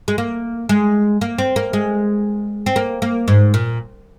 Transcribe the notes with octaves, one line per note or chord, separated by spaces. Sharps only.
G#3
A#3
G#3
A#3
C4
A#3
G#3
C4
A#3
A#3
G#2
A#2